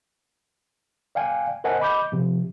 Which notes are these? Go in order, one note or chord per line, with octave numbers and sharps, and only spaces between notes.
D5 F5 G5 G#5
A#4 C5 D#5 F#5 G#5 A5
D#5 B5 D6 G6
C3 F3